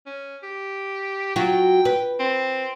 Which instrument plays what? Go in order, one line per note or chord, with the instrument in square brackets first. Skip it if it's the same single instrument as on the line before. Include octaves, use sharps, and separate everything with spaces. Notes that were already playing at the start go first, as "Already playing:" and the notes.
[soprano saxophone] C#4
G4
[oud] F#3 F4 F#4 [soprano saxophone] G5
[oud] B4
[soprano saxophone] C4